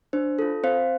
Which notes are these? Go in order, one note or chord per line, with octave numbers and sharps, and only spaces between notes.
D4 C5
F4 A4
C4 C5 F5